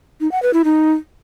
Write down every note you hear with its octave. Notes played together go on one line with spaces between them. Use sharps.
D#4
F#5
B4
E4
D#4